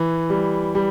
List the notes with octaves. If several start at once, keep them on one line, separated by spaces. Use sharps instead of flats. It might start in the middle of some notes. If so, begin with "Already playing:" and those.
Already playing: E3
G3
G3